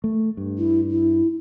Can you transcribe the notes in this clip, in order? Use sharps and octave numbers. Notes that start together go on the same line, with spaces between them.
A3
G2
E4
E4